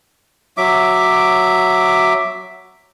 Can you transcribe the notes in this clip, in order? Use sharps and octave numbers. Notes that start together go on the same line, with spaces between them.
F#3 E5 D6